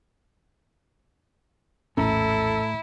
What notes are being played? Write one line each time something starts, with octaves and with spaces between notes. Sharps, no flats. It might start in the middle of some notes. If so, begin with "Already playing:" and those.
A#1 E2 A2 A3 C#4 E4 A4 A#5